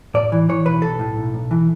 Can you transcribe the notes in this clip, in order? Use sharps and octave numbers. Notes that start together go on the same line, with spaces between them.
A2 D5
E3
E3 C#5
B1 B4
B1 A4
A2
B1
B1
E3